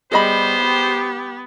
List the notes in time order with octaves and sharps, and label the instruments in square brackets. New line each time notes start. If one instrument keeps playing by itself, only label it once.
[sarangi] G3 [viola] B3 [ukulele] G#4 D#5 B5 [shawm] C5
[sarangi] G4